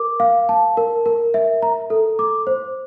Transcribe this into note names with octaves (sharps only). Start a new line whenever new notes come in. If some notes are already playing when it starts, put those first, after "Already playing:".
Already playing: A#4 D6
F5
A5
A#4
A#4
E5
A#5
A4
D6
C5